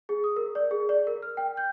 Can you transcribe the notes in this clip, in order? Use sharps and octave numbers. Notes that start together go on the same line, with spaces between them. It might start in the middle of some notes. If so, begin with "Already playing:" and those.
G#4
D#6
A#4
D5
G#4
D5
A#4
F6
G5
G6